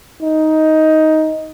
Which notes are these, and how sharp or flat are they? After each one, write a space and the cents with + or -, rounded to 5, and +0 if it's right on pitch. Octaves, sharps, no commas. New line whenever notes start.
D#4 +10